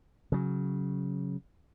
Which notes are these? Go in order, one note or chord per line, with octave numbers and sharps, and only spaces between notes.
C#3 F#3